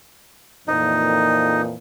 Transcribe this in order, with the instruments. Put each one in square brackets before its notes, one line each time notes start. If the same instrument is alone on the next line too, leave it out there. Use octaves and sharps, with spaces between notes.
[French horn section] F2 A#2 E3 [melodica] D#4